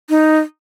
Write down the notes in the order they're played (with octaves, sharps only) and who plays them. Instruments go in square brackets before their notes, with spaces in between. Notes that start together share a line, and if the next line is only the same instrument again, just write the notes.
[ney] D#4